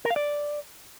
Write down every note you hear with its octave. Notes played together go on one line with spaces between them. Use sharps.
A#4
F5
D5